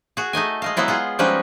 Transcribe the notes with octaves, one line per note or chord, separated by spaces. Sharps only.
F#4 G#4
A3 D#4 D#5 G#5
G#3 D#5 F5
F#3 G#3 B3 E4 F4
F4 G#4 F#5
F3 G3 G#3 C#4 D#4 B4